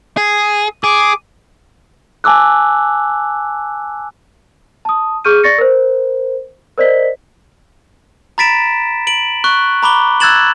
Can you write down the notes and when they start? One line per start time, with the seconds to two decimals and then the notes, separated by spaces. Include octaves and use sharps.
0.17 G#4
0.84 G#4 D6
2.24 G#5 A5 D6 E6 F#6
4.85 A5 D#6
5.25 G#4 C#6 F6 G6 D#7
5.43 D5 C#6 A6 A#6 C#7
5.58 A#4 C5
6.78 A#4 C5 D5 D#5 B6
8.38 A#5 B5 A6 B6 D7 E7
9.07 D7 F#7
9.44 C#6 F#6
9.83 A#5 B5 D6 G7
10.20 E6 F#6 G#6 A6 E7 F#7